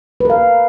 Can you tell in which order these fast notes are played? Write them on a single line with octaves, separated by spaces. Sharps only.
B4 A#4 F5